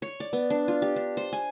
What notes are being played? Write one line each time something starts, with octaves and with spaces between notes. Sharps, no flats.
C#5
D5
B3
D4
F4
G4
D4
C5
G#5